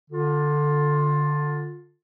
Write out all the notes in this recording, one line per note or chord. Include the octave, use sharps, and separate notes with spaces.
D3 F4